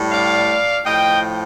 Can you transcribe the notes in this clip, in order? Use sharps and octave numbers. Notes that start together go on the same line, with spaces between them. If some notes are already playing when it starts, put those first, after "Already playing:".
Already playing: A2 G3
D5 F5
A2 F3 D#5 G5